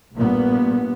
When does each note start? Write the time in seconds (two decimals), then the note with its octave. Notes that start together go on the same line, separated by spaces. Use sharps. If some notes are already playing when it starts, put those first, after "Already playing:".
0.15 A#1 G2 A#2 A#3 B3